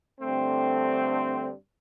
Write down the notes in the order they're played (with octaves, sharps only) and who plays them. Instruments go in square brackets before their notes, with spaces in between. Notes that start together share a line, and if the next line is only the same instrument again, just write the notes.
[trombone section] G2 D3 A3 C4